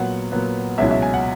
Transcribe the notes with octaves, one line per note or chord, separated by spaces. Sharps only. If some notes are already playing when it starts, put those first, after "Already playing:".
Already playing: A#2 F#3 B3 F#5
A#2 F#3 B3
C#2 B2 F#3 C#4 E4 E5
E5
G#5
F#5